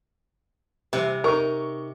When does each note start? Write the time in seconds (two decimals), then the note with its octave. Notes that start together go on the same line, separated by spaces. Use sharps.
0.93 C3 E3 G3
1.24 D#4 A#4 C#6